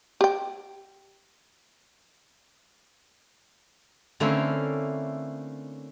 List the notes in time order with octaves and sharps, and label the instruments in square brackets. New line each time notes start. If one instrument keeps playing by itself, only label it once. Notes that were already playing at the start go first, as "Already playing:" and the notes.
[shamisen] G4 G5
[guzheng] D3 A3 A#3 C4 C#4 E4